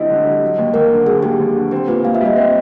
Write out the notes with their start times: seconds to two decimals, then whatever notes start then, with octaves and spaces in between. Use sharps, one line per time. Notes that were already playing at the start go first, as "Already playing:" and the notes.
Already playing: D3 G3 C4 E4 D#5
0.10 D3
0.25 G3
0.42 F#3
0.58 D#2
0.74 D#2 A#4
0.91 D3
1.06 F#3 G#4
1.23 D#2 G4
1.40 D#2
1.55 D3
1.71 C4 G4
1.88 A#2 B4
2.04 A#2 F5
2.14 E5
2.21 G3 D#5
2.36 C4 D#5